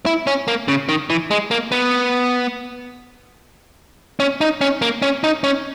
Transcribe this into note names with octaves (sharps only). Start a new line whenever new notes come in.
E4
C#4
A#3
C#3
D#3
E3
G#3
A#3
B3
C#4
D#4
C#4
A#3
C#4
D#4
C#4